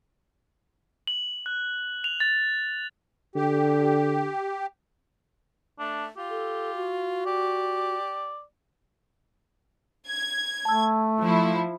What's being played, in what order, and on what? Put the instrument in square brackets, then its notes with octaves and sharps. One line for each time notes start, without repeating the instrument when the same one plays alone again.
[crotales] F#7
F#6
F7
A6
[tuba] D3 [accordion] G4
[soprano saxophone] A3 [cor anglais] D4
[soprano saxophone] F4 [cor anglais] G4
[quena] A4
F#4
[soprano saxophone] G4 [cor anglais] D5
[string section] G#6
[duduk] A3 [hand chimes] A5 E6
[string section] F3 E4